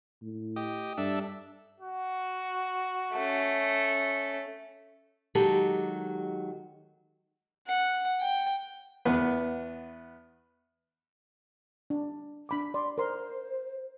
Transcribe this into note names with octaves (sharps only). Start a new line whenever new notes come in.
A2
G4 D#5
G2 D4 A4 E5
F#4
A3 C#4
D#3 F#3 G#3 G4 A4
F#5
G5
E2 B3 B4
D4
D4 B5 D6
D5 C6
A#4 C5 C6